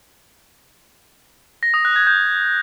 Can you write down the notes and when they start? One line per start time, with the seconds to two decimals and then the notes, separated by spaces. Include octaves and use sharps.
1.63 A#6
1.74 D#6
1.85 F#6
1.96 G#6
2.07 G6